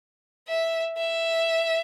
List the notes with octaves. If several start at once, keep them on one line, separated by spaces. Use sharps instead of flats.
E5
E5